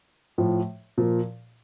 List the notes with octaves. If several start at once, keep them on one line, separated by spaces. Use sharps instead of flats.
A2 F3
A#2 F3